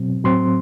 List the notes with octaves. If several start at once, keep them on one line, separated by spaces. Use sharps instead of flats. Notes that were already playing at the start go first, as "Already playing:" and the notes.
Already playing: B2 F#3 C4
A2 F#3 C4 C6